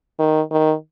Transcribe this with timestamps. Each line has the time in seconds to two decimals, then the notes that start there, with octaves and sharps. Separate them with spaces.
0.19 D#3
0.51 D#3